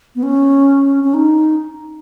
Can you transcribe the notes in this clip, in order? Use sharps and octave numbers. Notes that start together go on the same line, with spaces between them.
B3
C#4
C#4
D#4